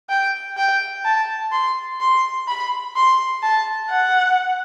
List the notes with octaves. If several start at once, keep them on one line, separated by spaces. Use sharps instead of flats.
G5
G5
A5
C6
C6
B5
C6
A5
F#5